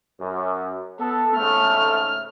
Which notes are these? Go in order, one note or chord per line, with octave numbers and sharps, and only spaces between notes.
F#2
B3 A4
G#2 C#3 A3 F6